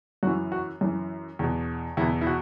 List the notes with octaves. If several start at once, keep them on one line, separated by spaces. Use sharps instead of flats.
F#2 E3 F#4
F#4
F#2 E3
E2 B2
E2 B2 E4
E4
F#4